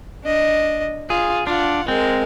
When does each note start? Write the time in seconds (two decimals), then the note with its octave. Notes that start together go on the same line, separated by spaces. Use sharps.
0.25 D4 D#5
1.10 F4 G#4
1.47 D4 F4 F#5
1.88 G#3 C4 A#4